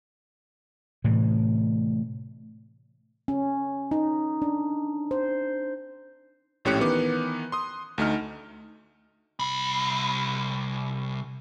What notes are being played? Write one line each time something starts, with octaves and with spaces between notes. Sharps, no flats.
A2 C3 E3
C#4
D#4
D4
C5
A#1 A2 C#4 G4 F#6 C#7
D#3 E3 B3 D6
C6 D#6
D2 A3 D#4 F6
C2 B5